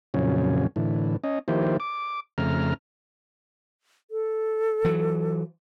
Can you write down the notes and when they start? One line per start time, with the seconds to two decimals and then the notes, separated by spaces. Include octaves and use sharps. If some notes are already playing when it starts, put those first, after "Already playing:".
0.14 F2 A#2 C#3 F#3 C#4
0.76 A2 D3 E3
1.24 C#4 D#5
1.48 D#3 F3 A#3 E4 G4 C5
1.80 D6
2.38 F2 C#3 A3 A#5 F6
4.11 A4
4.85 E3 F#3